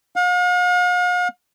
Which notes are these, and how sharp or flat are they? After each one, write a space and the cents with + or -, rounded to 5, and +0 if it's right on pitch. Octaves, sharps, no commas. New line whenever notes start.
F5 +45